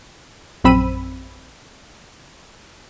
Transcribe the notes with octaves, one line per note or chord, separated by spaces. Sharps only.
A#1 F#2 C4 B5 E6 D#7